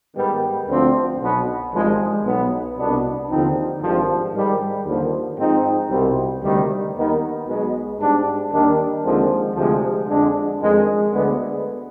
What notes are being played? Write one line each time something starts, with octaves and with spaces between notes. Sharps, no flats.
G#2 D#3 G3 B3
D2 D3 F3 C4
B1 B2 B3
G#1 G2 F3 G#3
B1 B2 B3
C2 B2 B3 D4
D#2 D3 F3 C4 D#4
G#1 G2 F3
G#2 D#3 G3
D#2 D3 F3
G#2 F3 C4 D#4
C2 B2 G3 C4
D2 C3 D#3 G3
D#2 D#3 B3 D#4
B1 B2 G#3 B3
G#2 G3 D4
D#2 D#3 G3 D4
D#2 D3 F3 G#3 C4
D2 C3 F3 G#3
F2 D3 G#3 D4
F2 D#3 G#3
D2 D3 G#3 B3